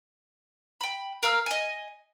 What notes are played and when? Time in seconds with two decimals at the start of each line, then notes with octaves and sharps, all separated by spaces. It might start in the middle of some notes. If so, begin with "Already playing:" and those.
0.81 G5 B5
1.23 A#4 F5 E6 F6
1.46 D#5 G#5